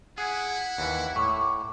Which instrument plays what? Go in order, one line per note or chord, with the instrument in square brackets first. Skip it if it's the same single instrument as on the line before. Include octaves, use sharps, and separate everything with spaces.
[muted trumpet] E4 [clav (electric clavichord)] G#4 [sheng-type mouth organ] F#5
[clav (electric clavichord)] D#2 E3
[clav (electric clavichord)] A2 [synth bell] C#6 D6